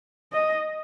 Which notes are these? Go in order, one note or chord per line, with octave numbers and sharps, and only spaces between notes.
D#5